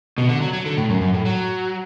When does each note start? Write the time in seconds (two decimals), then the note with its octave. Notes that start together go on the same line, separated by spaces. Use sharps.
0.18 B2
0.29 D3
0.42 F#3
0.53 F#3
0.66 D3
0.77 A2
0.90 F#2
1.01 F#2
1.14 A2
1.25 F#3